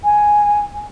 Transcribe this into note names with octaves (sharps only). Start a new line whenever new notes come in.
G#5